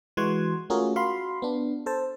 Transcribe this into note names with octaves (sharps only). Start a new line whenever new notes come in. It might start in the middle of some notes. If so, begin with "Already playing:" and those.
E3 G#3 F#4 F#5 C6 G#6
A3 C#4 F4 F#4 G#4 A#4
F#4 F5 B5 C6
B3 D4
A4 C5 A5